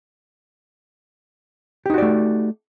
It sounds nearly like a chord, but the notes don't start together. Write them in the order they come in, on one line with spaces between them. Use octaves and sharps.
G4 D#4 F#4 D5 A3